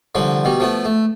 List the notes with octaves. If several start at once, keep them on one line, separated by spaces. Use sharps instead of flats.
C2 D3 F3
B2 G3
F3 A3 B3
A3